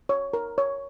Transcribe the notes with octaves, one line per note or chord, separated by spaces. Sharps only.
C#5
A#4
C#5